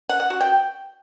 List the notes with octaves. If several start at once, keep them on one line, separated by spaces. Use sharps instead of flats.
F#5
F#5
F#4
G5